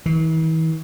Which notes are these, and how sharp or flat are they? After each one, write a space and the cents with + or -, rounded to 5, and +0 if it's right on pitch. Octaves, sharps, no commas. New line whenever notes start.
E3 -45